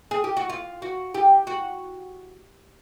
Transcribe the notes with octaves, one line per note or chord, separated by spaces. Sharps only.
G#4
G4
F#4
F4
F#4
G4
F#4